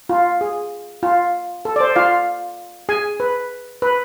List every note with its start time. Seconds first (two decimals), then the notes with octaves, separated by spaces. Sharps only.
0.09 F4
0.41 G#4
1.03 F4
1.65 A4
1.76 D5
1.80 C5
1.96 F4 F5
2.89 G#4 G#5
3.20 B4
3.82 B4